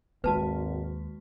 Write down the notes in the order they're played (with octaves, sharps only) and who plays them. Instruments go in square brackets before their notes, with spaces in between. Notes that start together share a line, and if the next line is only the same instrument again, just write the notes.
[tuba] G#1 [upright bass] D#2 [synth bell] G#3 F#4 [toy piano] B4 A5